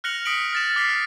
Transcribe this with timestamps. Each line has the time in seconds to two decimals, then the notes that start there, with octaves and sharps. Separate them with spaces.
0.04 F6 F#6 A#6 C#7 F7 F#7
0.25 D#6 B6 C#7 D7 F#7
0.37 F6
0.53 F6 A6 E7
0.76 D6 F6 B6 C7
0.90 F6